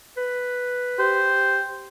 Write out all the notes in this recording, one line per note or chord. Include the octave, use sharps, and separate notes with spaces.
B4
G4 C5